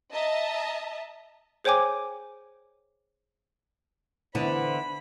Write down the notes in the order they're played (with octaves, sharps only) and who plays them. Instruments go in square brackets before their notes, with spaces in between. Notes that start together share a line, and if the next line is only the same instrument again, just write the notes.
[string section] D#5 E5 A5 A#5
[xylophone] G#4 C5 C#5 G5 G#5 D6
[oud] D3 B3 E4 [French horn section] E3 C5 [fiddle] B5